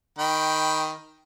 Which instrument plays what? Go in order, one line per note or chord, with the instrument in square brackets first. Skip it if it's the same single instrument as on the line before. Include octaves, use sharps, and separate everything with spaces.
[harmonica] D#3 G5 B5